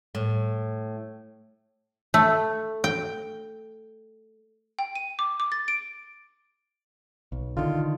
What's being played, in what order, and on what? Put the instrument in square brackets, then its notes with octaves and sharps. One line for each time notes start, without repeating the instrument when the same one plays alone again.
[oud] A2
[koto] A3
G5
[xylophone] G5
D#7
D6
D6
A6
D7
[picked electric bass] B1
[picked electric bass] D3 D#3 [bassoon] F4